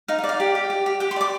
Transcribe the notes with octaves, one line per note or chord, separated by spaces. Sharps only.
D#4 F5
F5
D5
F5
G4
G4
G4
G4
G4 G5
C6
D5 D6